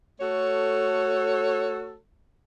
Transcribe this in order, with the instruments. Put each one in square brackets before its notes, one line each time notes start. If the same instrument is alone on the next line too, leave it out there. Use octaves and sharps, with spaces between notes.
[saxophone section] A3 F#4 A4 C#5